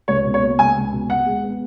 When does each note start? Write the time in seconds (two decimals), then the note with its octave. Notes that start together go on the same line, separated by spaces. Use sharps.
0.08 C#2 C#5
0.25 B2
0.34 C#5
0.43 A#3
0.59 C#2 G#5
0.76 C#2
0.92 B2
1.10 B2 F#5
1.26 G#3
1.44 B3